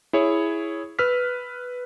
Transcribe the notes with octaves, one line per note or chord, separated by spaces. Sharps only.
E4 G#4 C#5
B4 E6 F6 B6